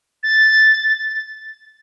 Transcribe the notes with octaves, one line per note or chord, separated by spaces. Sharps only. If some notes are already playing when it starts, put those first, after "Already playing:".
A6